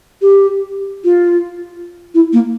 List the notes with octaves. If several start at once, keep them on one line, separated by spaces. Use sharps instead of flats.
G4
F4
E4
A#3